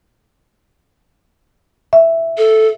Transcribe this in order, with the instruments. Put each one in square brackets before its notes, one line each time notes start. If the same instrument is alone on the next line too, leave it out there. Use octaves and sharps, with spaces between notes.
[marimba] E5
[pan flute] A4